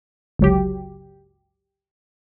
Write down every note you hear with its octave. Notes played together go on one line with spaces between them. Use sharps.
G1 C#2 F#3 G4